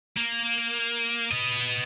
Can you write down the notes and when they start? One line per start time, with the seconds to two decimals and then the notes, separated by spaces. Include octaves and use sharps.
0.17 A#3
1.31 B3 D#5